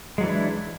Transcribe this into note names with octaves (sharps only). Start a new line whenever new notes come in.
E3 F#3 G#3 D4 E4